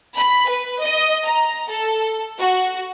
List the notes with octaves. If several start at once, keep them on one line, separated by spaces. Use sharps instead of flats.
B5
B4
D#5
A#5
A4
F#4